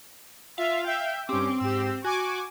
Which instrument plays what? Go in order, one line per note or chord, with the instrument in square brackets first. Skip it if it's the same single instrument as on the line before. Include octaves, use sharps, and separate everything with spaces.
[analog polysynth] F4 [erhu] E5 [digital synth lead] F5
[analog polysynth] E5 [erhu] G5
[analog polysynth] G2 C#4 G4 [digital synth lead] C4 [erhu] D6
[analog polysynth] G#2 G4 [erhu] E6
[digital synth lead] F#4 [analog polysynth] G#5 D6 [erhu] C#6